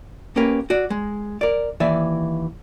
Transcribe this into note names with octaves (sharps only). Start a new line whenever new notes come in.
A#3 C#4 G4 A#4 B4
F#4 D5
G#3
A#4 D5
D#2 E3 D5 E5